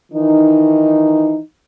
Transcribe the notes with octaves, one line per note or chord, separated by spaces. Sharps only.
D#3 E3 D#4